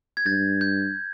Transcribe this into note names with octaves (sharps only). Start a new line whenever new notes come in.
G#6
G2 G6 A6
G6